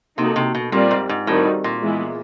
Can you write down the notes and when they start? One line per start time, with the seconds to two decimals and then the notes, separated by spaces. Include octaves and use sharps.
0.18 C3 A#3 D#4 F#4 A4
0.36 C3
0.55 B2
0.72 A#2 G3 C4 F4 A#4 D5
0.91 G#2
1.09 G#2
1.27 A2 D#3 G3 C4 D#4 F#4
1.64 A#2
1.82 E3 G#3 B3 E4